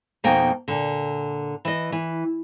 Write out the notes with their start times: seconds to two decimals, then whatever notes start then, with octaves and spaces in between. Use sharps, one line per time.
0.24 F2 B2 A#3 D#4 G5 G#5
0.68 A#2 D3
1.65 E3 D#5
1.92 E3